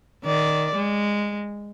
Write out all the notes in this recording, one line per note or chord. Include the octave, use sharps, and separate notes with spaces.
D#3 D5
G#3